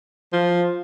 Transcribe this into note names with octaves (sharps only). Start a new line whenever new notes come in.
F3